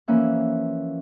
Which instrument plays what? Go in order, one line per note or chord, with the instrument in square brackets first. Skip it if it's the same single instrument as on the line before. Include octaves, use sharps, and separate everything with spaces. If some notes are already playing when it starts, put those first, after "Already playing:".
[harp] E3 F3 A#3 C#4 E5 F#6